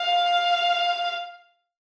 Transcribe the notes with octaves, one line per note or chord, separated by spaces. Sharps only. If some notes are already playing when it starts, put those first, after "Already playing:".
Already playing: F5